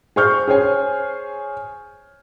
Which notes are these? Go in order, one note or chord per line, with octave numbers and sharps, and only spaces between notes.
G#4 C5 C#6 F6 G6
G#4 C5 C#5 G#5